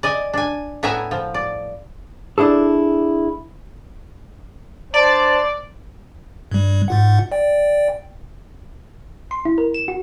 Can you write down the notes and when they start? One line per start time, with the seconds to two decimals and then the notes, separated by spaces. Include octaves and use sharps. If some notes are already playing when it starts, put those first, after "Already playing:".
0.03 D5 D#5 G#5
0.33 D4 G#5
0.83 A2 B3 E4 E5 G#5 A#5
1.11 F3
1.34 D5
2.38 D4 E4 G#4 A4
4.94 D4 C5 D5 A5
6.51 G2 G3
6.88 G#2 F4 F#5
7.32 D5 G5
9.31 C6
9.45 E4
9.58 A#4
9.74 E7
9.88 F#4